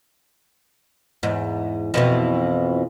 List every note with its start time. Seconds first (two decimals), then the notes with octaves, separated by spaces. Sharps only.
1.23 E2 G#2
1.94 F2 B2 E3